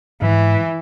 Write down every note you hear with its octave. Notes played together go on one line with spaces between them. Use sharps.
G#2 E3